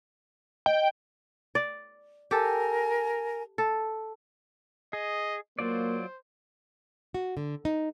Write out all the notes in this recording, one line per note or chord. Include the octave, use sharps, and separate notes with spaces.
D#5 G5
D5
G4 A4 A#4 G#5
A4
G#4 D#5
F#3 A#3 F4 C5 D5
F#4
D3
D#4